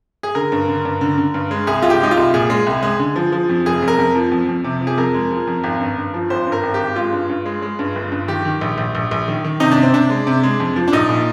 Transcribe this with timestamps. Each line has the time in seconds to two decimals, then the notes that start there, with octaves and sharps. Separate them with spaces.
0.23 G#4
0.35 D3 A#4
0.52 G2
0.68 D3
0.85 G2
1.01 D3
1.18 D3
1.34 G2
1.51 G#3
1.67 C2 G#4
1.82 C2 F4
1.90 G4
2.00 G#3 D#4
2.11 F4
2.17 C2
2.34 A#2 G#4
2.50 G#3
2.67 C2
2.83 G#3
2.99 D3
3.16 F3
3.32 F3
3.49 F2
3.66 F1 G#4
3.82 F2
3.88 A#4
3.99 F2
4.15 F3
4.32 F2
4.48 F2
4.64 C3
4.81 F3
4.87 G#4
4.97 F2 A#4
5.14 G#3
5.31 F3
5.47 F2
5.64 G#1
5.80 G2
5.97 G2
6.14 F3
6.30 G#1 C5
6.47 G2
6.52 A#4
6.63 G#1
6.74 G4
6.80 G#1
6.96 G#3 F4
7.12 G2
7.29 G2
7.46 G#3
7.62 G#3
7.79 G2
7.95 G1
8.12 G2
8.28 D#3 G4
8.45 D#3
8.61 A#1
8.78 A#1
8.95 A#1
9.11 A#1
9.28 D#3
9.45 D#3
9.60 C3 D#4
9.71 D4
9.77 C3
9.83 C4
9.93 C3 D4
10.10 G#3
10.27 C3
10.43 G#3
10.60 F2
10.76 F3
10.88 D4
10.93 A#1 D#4
11.09 A#2